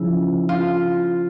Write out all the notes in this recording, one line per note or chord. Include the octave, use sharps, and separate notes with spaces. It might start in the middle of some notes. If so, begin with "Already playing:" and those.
Already playing: C#3 F3 E4
F4